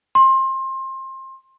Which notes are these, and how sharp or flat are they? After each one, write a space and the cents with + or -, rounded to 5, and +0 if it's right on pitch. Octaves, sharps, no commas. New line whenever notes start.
C6 +25